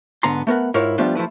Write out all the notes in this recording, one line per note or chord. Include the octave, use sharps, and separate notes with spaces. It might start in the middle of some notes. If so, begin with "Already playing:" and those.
G#2 D3 B3 A#5 C6
A3 B3 A#4 F#5
G#2 E4 F4 A#4 C#5
F3 G3 A3 B3 D4 F4
F3 A3 E4 B4